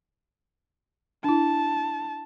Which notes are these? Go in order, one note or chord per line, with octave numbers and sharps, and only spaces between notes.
D4 E4 A5